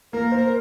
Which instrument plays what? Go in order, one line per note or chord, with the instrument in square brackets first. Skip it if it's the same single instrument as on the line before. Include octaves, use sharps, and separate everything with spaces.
[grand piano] A#3 [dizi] A#4
[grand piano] C5